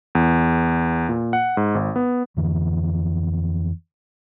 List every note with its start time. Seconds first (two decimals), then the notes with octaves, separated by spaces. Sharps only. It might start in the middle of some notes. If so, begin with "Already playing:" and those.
0.15 E2
1.09 A#2
1.33 F#5
1.57 G#2
1.75 G#1
1.96 B3
2.37 F2 D3 E3